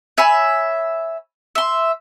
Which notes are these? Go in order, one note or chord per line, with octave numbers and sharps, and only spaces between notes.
C#5 E5 G#5 B5
E5 C6